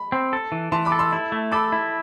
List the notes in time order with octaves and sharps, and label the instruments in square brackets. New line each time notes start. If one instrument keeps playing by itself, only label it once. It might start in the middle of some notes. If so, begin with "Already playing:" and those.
Already playing: [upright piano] B5
[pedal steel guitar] C4
A4
E3
[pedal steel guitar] E3 [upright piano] A5 C6
[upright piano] B5 D6
[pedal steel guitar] A4
[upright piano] C6 E6
[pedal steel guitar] E4
A3
[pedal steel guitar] A4 [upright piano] B5 D6
[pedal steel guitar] E4